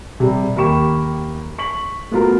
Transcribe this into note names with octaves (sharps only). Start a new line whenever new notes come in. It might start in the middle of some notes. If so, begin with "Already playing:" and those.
C3 G3
D#2 A#3 G4 B5 C#6 E7
C#6 B6 F#7
A3 B3 F4 F#4 A#4